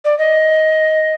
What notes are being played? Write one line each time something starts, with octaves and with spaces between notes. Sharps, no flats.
D5
D#5